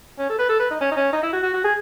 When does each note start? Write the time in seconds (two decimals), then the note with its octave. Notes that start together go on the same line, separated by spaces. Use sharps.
0.19 C#4
0.29 A4
0.39 B4
0.49 A4
0.60 B4
0.71 D#4
0.81 C#4
0.92 D#4
0.96 C#4
1.13 D#4
1.23 E4
1.33 F#4
1.43 F#4
1.54 F#4
1.65 G#4